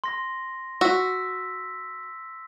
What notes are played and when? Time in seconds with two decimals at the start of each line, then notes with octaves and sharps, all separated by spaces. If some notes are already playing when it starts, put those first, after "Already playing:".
0.04 C6 A#6
0.81 F#4 E6 B6